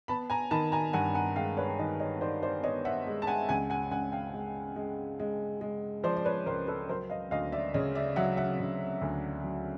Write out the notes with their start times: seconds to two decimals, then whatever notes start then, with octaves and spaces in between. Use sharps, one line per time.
0.08 B3 A5 B5
0.30 G#5 A#5
0.51 D#3 A5 B5
0.72 G#5 A#5
0.93 G2 F#5 G#5
1.15 F#5 G#5
1.36 G#3 F5 G5
1.57 B4 C#5
1.79 D#3 C#5 D#5
1.99 C#5 D#5
2.21 D#3 C5 D5
2.43 C5 D5
2.63 B3 C#5 D#5
2.85 E5 F#5
3.07 G#3
3.22 A5
3.27 F#5 G#5
3.49 C#2 F#5 G#5
3.70 F#5 G#5
3.91 C#2 F#5 G#5
4.12 F5 G5
4.34 G#3
4.76 G#3
5.19 G#3
5.61 G#3
6.03 F3 C5 D5
6.17 D5
6.25 B4 C#5
6.46 C#2 A#4 C5
6.67 A4 B4
6.89 F#3 A#4 C5
7.10 D#5 F5
7.31 D2 D#5 F5
7.52 D5 E5
7.74 C#3 C#5 D#5
7.95 D5 E5
8.16 F#3 E5 F#5
8.37 E5 F#5
8.60 C#3
9.01 D2
9.44 F#3